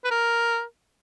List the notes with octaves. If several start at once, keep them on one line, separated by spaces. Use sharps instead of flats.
B4
A#4